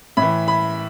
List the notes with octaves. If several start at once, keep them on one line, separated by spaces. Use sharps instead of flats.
A2 E3 B5
B5